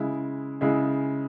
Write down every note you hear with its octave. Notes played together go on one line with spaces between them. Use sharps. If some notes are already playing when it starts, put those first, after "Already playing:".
Already playing: C#3 G#3 E4
C#3 G#3 E4